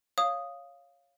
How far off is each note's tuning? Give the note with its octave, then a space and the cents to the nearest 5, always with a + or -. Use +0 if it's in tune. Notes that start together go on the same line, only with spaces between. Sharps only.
C#5 +0 F5 +0 D#6 +0